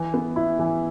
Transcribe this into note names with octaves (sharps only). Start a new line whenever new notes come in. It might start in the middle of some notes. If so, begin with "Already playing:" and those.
Already playing: E3
B3
E4
E3